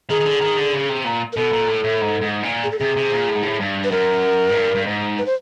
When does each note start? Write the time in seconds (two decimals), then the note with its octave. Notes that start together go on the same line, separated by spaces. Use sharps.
0.10 D#3 G#4
0.21 D#3
0.25 D3
0.41 D#3
0.57 D3
0.73 C#3
0.89 C3
1.04 A#2
1.33 A#4
1.37 B2 A4
1.53 A#2
1.68 A2
1.84 A2
2.01 G#2
2.21 G#2
2.43 A#2
2.64 G#4
2.71 A4
2.79 C3 G#4
2.97 C3
3.12 A#2
3.28 A2
3.35 G#2
3.43 A2
3.60 G2
3.84 B4
3.92 F#2 A#4
4.50 G#2
4.55 G2
4.75 G2
4.87 G#2
5.18 B4
5.26 C5